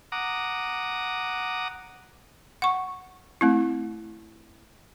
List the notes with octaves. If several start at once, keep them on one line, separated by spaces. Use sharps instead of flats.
F#5 A#5 D6 D#6
F#5 C#6
A3 C4 E4